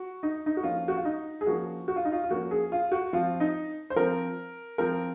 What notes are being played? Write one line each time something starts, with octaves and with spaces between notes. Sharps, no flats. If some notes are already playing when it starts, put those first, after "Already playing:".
Already playing: F#4
D#4
D#4
F#4
F3 A#3 C#4 F4
F#4
F4
D#4
G#4
F3 A#3 C#4 F#4
F#4
F4
D#4
F4
F4
F3 A#3 C#4 F#4
G#4
F4
F#4
F3 C4 F4
D#4
C5
F3 C4 A#4
F3 C4 A#4